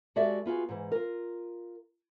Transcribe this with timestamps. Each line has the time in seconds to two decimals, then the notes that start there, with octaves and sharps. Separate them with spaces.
0.16 G#3 F#4 G4 A4 D5 E5
0.46 B3 F4 F#4 G#4
0.69 G#2 E3
0.92 F4 A#4